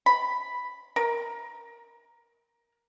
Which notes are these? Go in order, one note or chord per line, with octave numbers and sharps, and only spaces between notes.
B5
A#4